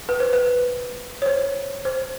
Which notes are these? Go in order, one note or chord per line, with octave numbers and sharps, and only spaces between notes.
B4
C5
B4
C#5
C5
C5